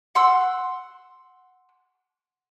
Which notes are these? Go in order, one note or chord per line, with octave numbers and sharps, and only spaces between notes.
F#5 C6 E6